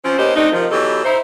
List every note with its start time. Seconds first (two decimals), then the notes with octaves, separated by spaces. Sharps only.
0.05 F3 C4 C#4
0.18 A#3 B3 C#4 D#4 G4 C5
0.36 A3 C4 D4 D#4
0.52 C3 D#3 F3
0.71 B2 E3 F#3 D#4 G4 A4
1.04 D#4 E4 C5